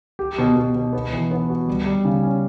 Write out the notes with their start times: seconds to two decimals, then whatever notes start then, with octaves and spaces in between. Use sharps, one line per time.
0.19 G4
0.38 B2
0.56 B2
0.75 B2
0.93 B3
1.13 E3
1.31 B3
1.50 F#4
1.68 G3
1.86 G3
2.05 C#3
2.23 C#4